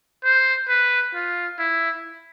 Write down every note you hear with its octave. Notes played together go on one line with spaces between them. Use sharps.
C5
B4
F4
E4